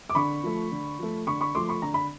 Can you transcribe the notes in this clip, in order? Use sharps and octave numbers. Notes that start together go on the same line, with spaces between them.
D6
D3 B5 C#6
F3 A3
D3
F3 A3
D3 B5 C#6
B5 C#6
F3 A3 C6 D6
B5 C#6
D3 A#5
B5